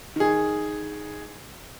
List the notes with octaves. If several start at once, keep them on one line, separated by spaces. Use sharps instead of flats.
D#3 G#4